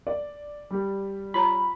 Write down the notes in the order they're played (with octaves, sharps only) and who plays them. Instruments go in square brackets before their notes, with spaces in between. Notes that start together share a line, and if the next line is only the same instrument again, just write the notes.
[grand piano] D5
[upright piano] G3 G4
[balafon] F4 C#5 A#5 [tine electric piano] B5